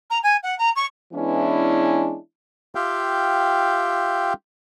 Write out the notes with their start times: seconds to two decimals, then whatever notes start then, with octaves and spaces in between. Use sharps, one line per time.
0.10 A#5
0.23 G#5
0.43 F#5
0.58 A#5
0.76 C#6
1.13 E3 G#3 B3 C#4 D4 E4
2.75 F4 G4 E5 F5 G5